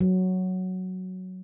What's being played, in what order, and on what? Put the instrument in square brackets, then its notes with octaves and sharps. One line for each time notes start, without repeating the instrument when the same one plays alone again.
[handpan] F#3